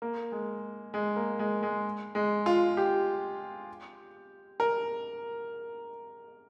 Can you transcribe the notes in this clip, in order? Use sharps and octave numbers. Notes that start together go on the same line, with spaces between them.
A#3
G#3
G#3
A#3
G#3
G#3
G#3
F4
G4
A#4